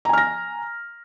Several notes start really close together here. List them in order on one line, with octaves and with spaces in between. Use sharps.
A#5 G#5 F6 A#6